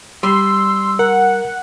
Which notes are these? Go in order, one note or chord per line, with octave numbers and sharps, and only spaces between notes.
G3 C6 E6
A#4 F#5